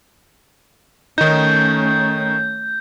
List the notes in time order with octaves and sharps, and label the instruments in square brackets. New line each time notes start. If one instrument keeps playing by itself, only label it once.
[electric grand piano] D#3 D#4 [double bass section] A3 C#4 [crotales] G6